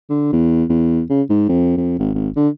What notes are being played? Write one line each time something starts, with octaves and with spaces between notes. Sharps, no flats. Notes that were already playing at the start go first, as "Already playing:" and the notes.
D3
E2
E2
C#3
G#2
F2
F2
G#1
G#1
D3